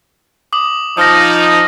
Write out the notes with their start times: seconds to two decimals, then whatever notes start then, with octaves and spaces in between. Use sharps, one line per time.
0.53 D6 D#6 F#7
0.97 F3 D#4 D#6 F6 A#6